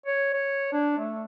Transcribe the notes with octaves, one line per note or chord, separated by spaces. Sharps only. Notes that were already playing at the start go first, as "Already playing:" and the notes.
C#5
C#5
D4
A3